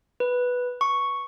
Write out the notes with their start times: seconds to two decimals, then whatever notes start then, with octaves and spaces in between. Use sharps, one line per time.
0.20 B4
0.81 C#6